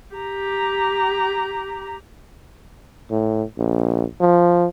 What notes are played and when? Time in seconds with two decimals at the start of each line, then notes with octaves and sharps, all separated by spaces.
0.15 G4 A#5
3.11 A2
3.58 A#1
4.21 F3